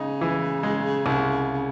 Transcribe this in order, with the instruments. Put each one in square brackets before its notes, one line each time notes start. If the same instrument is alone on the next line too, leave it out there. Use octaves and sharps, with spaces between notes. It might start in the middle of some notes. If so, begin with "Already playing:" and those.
Already playing: [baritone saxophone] C#3 [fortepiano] D#4
[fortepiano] E3
G#3
C2